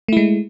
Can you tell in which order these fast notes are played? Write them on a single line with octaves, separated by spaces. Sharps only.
A3 E4 G#3